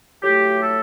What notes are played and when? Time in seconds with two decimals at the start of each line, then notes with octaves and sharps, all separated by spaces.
0.22 A2 F#3 A3 G4
0.62 A4